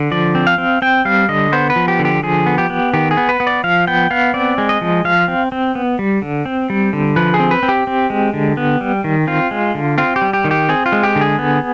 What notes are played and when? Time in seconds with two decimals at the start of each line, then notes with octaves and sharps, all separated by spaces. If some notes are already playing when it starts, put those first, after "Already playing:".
Already playing: D3
0.11 F3 D5
0.35 C4
0.47 F5
0.58 C4
0.82 C4 G5
1.05 G3 F5
1.29 D3 D#5
1.52 B3 C5
1.70 B4
1.76 F3
1.88 G4
1.99 D3
2.05 G4
2.23 F3 G#4
2.46 B3
2.58 G4
2.70 B3
2.94 D#3 G4
3.11 G#4
3.17 B3
3.29 B4
3.40 B3
3.47 D5
3.64 F3 F5
3.87 B3 G5
4.11 B3 F5
4.34 C4 D5
4.58 G#3
4.69 D#5
4.81 F3
5.04 F3 F5
5.28 C4
5.52 C4
5.75 B3
5.99 G3
6.22 D3
6.46 C4
6.70 G3
6.93 D3
7.16 F3 B4
7.34 G#4
7.40 C4
7.51 B4
7.63 C4
7.69 G4
7.87 C4
8.10 G#3
8.33 D3
8.57 B3
8.81 G3
9.04 D#3
9.27 C4 F4
9.51 G#3
9.75 D3
9.98 C4 F4
10.16 G4
10.22 G3
10.33 G4
10.44 D#3
10.51 G4
10.69 C4 G#4
10.86 F4
10.92 G#3
11.03 G4
11.16 D3
11.21 G#4
11.39 B3